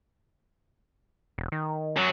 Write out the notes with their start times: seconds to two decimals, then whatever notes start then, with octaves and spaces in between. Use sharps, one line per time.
1.38 E1
1.52 D#3
1.96 F#2 F#3